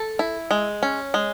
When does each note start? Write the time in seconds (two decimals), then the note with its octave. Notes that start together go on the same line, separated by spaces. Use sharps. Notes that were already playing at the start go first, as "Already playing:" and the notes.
Already playing: A4
0.19 E4
0.51 G#3
0.83 C#4
1.14 G#3